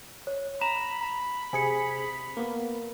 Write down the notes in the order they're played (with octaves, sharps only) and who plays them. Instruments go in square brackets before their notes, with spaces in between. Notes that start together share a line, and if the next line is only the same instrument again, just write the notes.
[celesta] C#5
[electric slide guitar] A#5 [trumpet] B5 [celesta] E7
[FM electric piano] C3 G#4 [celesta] G#5 C#7
[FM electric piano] A#3 B3